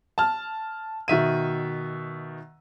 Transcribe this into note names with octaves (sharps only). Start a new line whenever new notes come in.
A5 F6
B2 D#3 E5 D#7